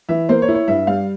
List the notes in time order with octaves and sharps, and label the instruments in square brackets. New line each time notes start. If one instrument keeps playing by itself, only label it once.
[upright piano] E3 E5
A#3 C5
C#5
E4
C#5
G2 E5
G3 F5